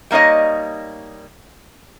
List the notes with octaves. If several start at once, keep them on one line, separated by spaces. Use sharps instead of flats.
G3 A#3 D#4 C#5 D#5